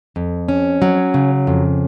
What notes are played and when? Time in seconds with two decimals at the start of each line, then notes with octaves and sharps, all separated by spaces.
0.16 F2
0.48 C#4
0.82 F#3
1.14 C#3
1.47 F2